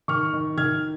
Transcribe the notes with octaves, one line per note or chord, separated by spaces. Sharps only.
D#3 C#6 F6
D#3
D#3 F6 G#6